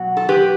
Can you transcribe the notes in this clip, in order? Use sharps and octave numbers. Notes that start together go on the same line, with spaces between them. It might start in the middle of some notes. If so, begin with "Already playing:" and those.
Already playing: B2 F#3 F#4
A4
G4 B4